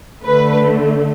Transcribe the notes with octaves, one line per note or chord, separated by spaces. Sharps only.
D3 A3 B4